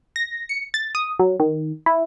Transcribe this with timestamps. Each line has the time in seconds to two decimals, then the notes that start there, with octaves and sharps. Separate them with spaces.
0.16 A#6
0.49 C#7
0.74 A6
0.95 D#6
1.19 F#3
1.40 D#3
1.86 E4